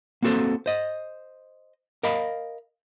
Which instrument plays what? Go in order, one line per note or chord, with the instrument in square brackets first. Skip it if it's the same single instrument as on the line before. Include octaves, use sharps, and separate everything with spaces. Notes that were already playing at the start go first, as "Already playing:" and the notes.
[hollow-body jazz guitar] A#3 C4 F#4 A4 C5
C5 D#5
A#4 D#5 F5 B5